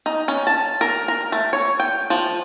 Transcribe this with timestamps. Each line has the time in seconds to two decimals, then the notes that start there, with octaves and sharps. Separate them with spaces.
0.06 D#4
0.28 C#4
0.47 A5
0.81 A#4
1.08 A#4
1.32 A3
1.53 C#5
1.80 G5
2.10 F3